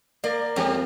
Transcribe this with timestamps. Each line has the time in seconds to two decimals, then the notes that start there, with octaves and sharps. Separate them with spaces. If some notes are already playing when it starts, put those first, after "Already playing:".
0.24 A#3 D5
0.56 F2 G3 C4 G4